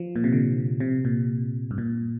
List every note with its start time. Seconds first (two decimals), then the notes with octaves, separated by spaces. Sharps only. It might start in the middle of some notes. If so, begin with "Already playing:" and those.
Already playing: F3
0.16 A#2
0.24 C3
0.33 D3
0.80 C3
1.05 A#2
1.71 G2
1.78 A#2